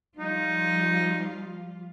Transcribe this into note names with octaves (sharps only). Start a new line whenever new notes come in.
F3 G3 D#4 F4